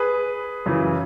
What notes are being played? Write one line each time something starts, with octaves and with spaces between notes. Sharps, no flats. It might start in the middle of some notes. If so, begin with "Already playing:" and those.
Already playing: G#4 B4
F#2 C#3 E3